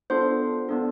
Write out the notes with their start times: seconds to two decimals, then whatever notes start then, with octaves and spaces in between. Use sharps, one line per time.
0.10 B3 D4 F4 A4 C5 C6
0.69 B3 D4 F4 A4